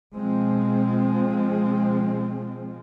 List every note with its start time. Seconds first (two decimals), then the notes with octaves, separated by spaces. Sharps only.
0.15 B2 F3 G#3 C4